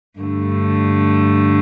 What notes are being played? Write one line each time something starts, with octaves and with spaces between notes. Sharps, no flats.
G2 D3 A3